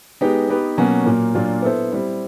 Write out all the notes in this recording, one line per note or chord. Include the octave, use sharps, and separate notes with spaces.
G#3 B3 D#4 G4
B3 D#4 G4 B4
B2 F#3 A#3 C#4 F#4
A#2 F#3 A#3
A#2 F#3 A#3 D4 F4
B3 E4 A4 C5
G3 C4 E4